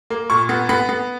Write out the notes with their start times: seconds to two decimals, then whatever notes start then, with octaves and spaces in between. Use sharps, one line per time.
0.10 A#3
0.30 A#2 C#6
0.49 B3
0.69 B3 B5
0.89 B3